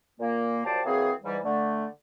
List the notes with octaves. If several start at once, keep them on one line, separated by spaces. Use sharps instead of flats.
A#2 A#3
F#2 F3 G4 C5 D5 A5
E3 F#3 A#3 C4 G#4
G#2 E3 G3
D3 A3